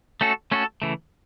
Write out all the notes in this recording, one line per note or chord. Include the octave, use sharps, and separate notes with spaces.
A3 C#4 F#4 A4
A3 C#4 F#4 A4
C#3 E3 A3